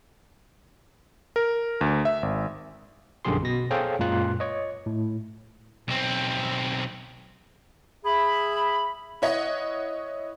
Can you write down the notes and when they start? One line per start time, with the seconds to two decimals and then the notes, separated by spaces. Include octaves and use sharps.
1.36 A#4
1.81 D2
2.05 E5
2.23 G#1
3.25 A#1 F#2 D3 G4 G#4 C6
3.43 B2 A#6
3.71 G#4 A4 C5 C#5 F5 G5
3.99 F#2 A#2 G#3 F4 F#6
4.40 C#5 D#5
4.86 A2
5.88 B1 C4
8.05 G#4 E5 B5
9.22 E4 C#5 D#5 F#5